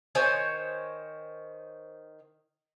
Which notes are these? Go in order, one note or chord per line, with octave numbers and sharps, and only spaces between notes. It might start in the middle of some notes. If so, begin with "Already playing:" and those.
D#3 C5 C#5 G#5